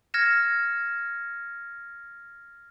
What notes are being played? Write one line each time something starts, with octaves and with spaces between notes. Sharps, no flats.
F6 G#6 A#6 C#7 E7